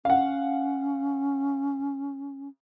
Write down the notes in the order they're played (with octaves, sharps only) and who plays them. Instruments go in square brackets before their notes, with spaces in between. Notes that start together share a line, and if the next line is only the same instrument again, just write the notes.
[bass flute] C#4 [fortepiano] F5 F#5